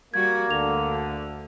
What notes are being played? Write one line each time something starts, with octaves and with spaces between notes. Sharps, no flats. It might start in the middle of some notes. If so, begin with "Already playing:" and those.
G3 A#3 F#4 G#6
D2 D3 F7